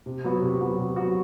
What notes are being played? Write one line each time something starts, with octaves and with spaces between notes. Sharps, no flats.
C3
F#3 B3 F#4
C3
F#3 B3 F#4
C3
F#3 B3 F#4